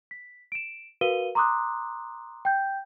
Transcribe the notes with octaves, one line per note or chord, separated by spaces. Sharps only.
B6
D7 E7
F#4 A#4 B4 F5 D#7 G7
A#5 C6 D6 D#6 F#6
G5 G6